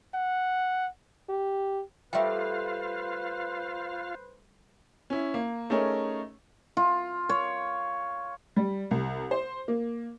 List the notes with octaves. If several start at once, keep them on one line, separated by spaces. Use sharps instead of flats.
F#5
G4
G3 A3 F4 B4 C5 E5 F5 G5
C#4 E4
A#3
A3 C#4 D#4 G#4 A#4 C#5
F4
C#5
G3
C2
C5
A#3